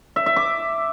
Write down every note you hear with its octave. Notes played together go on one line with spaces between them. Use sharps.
E5
E5
D6